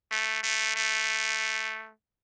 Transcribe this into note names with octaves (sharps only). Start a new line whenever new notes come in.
A3
A3
A3